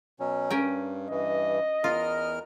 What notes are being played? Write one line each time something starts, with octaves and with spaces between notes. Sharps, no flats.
B2 F#3 C#4
G2 C#4 A#4 G5
G2 E3 D#5
E2 F4 A#4 F6